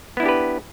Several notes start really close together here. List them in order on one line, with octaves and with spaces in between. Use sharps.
B3 E4 D4 G4 B4